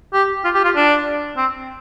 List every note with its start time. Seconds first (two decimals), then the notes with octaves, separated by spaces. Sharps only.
0.13 G4
0.44 F4
0.54 G4
0.64 F4
0.75 D4
1.37 C4